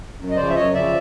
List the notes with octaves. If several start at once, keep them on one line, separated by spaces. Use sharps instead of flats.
F#2
D#5
C#3 F3 C5 D5
E5
F#2 C#5 D#5
C#3 F3 D5 E5